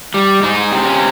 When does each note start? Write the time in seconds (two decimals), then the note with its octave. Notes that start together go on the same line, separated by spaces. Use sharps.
0.14 G3
0.43 G#3 D#4
0.71 C3
0.85 C#4